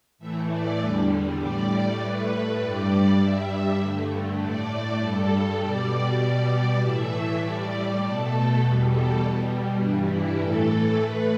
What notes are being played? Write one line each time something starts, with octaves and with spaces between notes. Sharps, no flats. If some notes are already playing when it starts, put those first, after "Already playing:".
A2 E3 A3 E5
D5
E2 D3 G3 B4
A2 G3 D5
A2 A3 B4
G2 G3 D5
G2 G3 E5
G2 D3 A3
A2 A3 D5
G2 G3 A4
B2 G3 D5
B2 G3 D5
A2 E3 A3 E5
A2 G3 D5
B2 A3 A4
E2 B2 G3 B4
A4
B2 G3
G2 E3 G3 D4
E4
A2 E3 A3 A4
A2 A3 B4